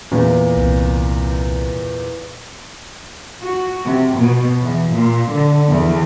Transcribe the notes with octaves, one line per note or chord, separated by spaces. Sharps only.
E2 A#2
C2 C4
F#4
C3
B2
E2
A#2
D3
E2